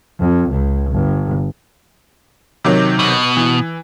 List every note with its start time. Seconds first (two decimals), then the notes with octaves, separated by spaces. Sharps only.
0.20 F2
0.51 C#2
0.91 G1
2.64 C3 D#3 F#3
2.99 B2
3.37 E3